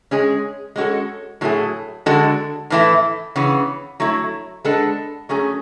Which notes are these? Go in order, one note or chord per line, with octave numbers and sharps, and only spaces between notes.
G#3 C#4 G#4
G#3 C#4 F#4 A4
A2 F#3 A3 E4 G#4
D3 G#3 D4 F#4 A4
A2 E3 A3 E4
C#3 E3 B3
F#3 A3 E4
G#3 B3 D4 A4
F#3 A3 C#4 G#4